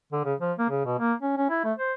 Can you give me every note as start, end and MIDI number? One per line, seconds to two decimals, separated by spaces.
0.12 0.23 50
0.25 0.34 49
0.40 0.53 53
0.58 0.68 58
0.70 0.84 49
0.85 0.96 47
0.99 1.13 58
1.22 1.34 61
1.37 1.50 61
1.50 1.61 64
1.64 1.73 57
1.78 1.93 72